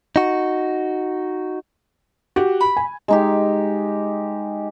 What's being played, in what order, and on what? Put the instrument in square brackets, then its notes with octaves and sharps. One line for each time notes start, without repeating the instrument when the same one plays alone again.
[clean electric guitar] D#4 F#4
[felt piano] F#4 G4
[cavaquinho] B5
[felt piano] G#5
[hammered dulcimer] G#3 D#4 G4